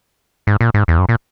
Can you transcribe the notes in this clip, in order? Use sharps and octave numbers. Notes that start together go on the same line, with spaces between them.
G#2
A#2
G#2
E2
F#2
A#2